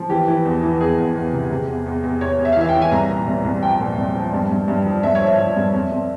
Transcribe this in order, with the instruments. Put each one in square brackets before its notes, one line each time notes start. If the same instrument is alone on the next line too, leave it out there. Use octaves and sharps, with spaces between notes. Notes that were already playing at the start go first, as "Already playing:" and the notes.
Already playing: [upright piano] F3
E3 G4
E3
E2
E3
E2 G#4
E2
E2
C3
C3
E2
E2
E2
E2 C#5
E2
E5
F5
E3 E5
G5
E3
G#5
C2 A#5
A#2
C2
C2
F3 G5
A#2
C2
F3
G2
G2
G2
F3
G2 E5
C#5
F3
E5
F3
G2
F2
F2